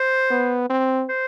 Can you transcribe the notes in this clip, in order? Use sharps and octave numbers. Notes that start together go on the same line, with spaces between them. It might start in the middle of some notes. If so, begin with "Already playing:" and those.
Already playing: C5
B3
C4
C5